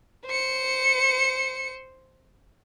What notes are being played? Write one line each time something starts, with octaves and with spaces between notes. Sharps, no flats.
C5 C#7